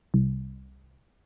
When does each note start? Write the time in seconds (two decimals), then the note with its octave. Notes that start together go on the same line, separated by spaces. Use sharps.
0.14 C2